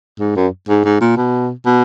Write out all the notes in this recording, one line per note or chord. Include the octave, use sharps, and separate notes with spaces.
G#2
F#2
G#2
G#2
A#2
B2
B2